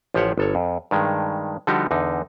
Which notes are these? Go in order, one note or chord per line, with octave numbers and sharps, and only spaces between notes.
A1 F3 G4 C5 C#5 F#5
G1 A4 C#5
F2
G2 D#3 G#3
D3 F3 G3 D#4 F#4 G4
E2 D3 D#4